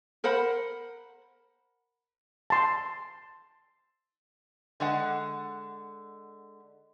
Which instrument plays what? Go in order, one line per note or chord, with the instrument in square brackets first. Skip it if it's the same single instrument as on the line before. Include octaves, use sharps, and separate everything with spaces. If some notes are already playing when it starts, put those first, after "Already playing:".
[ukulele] A#4 C5 F#5 B5
[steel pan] A5 C6
[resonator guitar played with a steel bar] D3 G#3 F#5